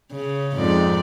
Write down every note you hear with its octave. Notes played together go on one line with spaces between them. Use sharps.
C#3
F2 G#2 D5